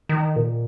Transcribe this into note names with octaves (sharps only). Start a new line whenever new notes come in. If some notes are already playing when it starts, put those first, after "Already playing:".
D#3
A#2